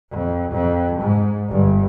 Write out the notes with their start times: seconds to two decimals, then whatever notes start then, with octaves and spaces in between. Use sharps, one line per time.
0.11 F2
0.51 F2
1.00 G#2
1.49 G1 G2